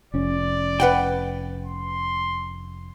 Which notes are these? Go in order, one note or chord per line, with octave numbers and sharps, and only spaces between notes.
F1 C#4 D5
B4 F#5 G5
C6